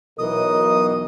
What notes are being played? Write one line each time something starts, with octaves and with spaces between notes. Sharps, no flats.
B1 E3 A#4 D#5 D#6